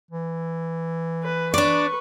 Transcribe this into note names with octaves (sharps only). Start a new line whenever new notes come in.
E3
B4
D4 B4 D5 C#6